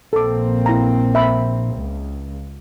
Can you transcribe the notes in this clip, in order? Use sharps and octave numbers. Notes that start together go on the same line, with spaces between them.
A#1 A#3 C4 A4 D6
E4 A#5
E5 B5
C#2